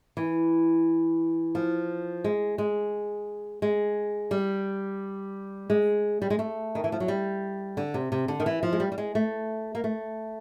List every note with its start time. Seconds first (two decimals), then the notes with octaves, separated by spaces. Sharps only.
0.17 E3
1.55 F3
2.24 G#3
2.58 G#3
3.62 G#3
4.31 G3
5.70 G#3
6.22 G3
6.30 G#3
6.39 A3
6.75 D#3
6.84 E3
6.92 F3
7.00 F#3
7.08 G3
7.77 D3
7.94 C3
8.12 C3
8.28 D3
8.40 D#3
8.46 E3
8.63 F3
8.73 G#3
8.80 G3
8.92 G3
8.98 G#3
9.15 A3
9.75 A#3
9.84 A3